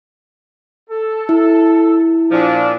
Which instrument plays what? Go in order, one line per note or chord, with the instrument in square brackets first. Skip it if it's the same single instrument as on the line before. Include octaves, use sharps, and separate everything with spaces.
[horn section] A4
[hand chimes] E4
[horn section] A#2 F3 D4